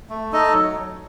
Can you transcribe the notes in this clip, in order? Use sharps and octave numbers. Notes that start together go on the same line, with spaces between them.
A3
D#4 A4 D#5
F#3